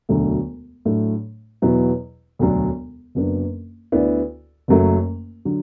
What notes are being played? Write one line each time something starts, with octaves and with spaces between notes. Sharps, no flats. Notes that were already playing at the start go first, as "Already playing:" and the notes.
E1 D2 D3 F#3 A3
A2 F#3 A3 D4
E2 B2 F#3 B3 E4
E1 D2 D3 F#3 D4
F#1 F#2 F#3 B3 D4
D2 D3 B3 E4 D5
F#1 F#2 F#3 A3
D3 F#3